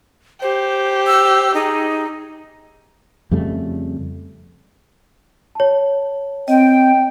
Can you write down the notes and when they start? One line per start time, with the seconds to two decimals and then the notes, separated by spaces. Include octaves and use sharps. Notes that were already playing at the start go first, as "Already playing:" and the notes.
0.42 G4 C5
1.07 E6
1.54 D#4 G#4
3.31 F2 C#3 G3 A3
5.55 C#5 A5
6.48 C4 D#5 G5